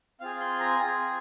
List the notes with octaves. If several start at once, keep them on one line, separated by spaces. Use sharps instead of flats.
C4 F4 G#4 F5
C6
A#5
C4 F4 G#4 G#5